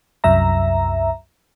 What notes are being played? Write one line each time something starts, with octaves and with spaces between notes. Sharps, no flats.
C2 F#2 E5 A#5